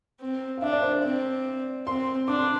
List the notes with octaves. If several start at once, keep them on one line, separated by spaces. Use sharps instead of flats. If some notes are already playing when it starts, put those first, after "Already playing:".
C4
F5
D4 E5
D5
C5
D5
C4
C4 C6
D4 D6
C6